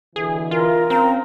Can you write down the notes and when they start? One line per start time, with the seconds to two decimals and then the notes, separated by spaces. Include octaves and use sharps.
0.16 B2 D3 E3 G#4
0.51 F4 A#4
0.90 C4 C#4 F5 A#5